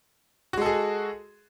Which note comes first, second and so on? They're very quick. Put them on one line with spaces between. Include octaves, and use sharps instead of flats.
F#4 G#3 A4 G#4